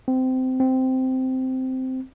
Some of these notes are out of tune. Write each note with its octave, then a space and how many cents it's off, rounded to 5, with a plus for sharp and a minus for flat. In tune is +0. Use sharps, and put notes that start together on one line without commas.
C4 -20
C4 -10